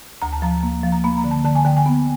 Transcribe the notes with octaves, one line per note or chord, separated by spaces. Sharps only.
D2 A#5
A5
F3 A#5
A#3
F3
A#5
A#3 B5
A#5
D3
A5
D3 A5
G#5
D3 G5
G#5
B3